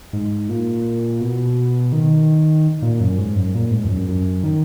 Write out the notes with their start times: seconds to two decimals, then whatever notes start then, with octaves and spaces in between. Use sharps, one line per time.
0.13 G#2
0.49 A#2
1.21 B2
1.92 D#3
2.82 A#2
3.00 F#2
3.18 G#2
3.36 F#2
3.54 A#2
3.71 G#2
3.85 E2
3.90 F#2
4.08 F#2
4.44 D#3